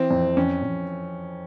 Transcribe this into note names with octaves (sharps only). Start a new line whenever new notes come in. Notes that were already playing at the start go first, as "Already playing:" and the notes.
Already playing: E3 C4
F2
F2 C#4
F2